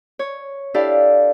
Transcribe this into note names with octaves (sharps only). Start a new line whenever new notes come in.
C#5
D4 E4 G4 A4 D5 F5